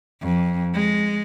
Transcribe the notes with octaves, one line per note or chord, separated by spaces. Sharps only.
F2
G#3